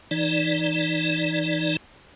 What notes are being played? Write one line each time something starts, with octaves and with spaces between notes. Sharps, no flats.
E3 D#4 D5